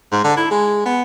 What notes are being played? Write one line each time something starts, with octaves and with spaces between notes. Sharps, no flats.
G#2
D3
E4
G#3
B3